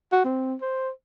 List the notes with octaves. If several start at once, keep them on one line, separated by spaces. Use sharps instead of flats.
F#4
C4
C5